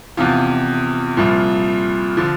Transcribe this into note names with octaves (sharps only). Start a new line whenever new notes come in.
E2 C3 F3 F4
C2 A#2 F3
D3 F3